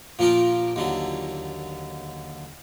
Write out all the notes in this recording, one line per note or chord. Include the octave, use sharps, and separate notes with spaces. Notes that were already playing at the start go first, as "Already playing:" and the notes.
A#2 F3 A#3 G4 A#4
D#2 D3 F#3